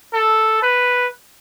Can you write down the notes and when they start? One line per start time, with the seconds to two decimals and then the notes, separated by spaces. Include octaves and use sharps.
0.14 A4
0.62 B4